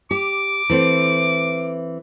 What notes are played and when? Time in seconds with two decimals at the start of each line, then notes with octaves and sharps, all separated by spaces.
0.11 G4 D6
0.70 E3 A3 C4